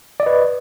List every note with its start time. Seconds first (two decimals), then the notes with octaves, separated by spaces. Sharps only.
0.20 D5
0.23 D#5
0.26 B4